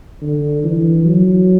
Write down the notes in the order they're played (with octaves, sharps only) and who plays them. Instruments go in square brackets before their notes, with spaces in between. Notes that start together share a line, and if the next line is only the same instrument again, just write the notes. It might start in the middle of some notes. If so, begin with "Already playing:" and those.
[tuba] D3
E3
F#3